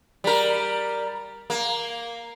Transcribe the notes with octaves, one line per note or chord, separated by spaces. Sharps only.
G3 A#4
A#3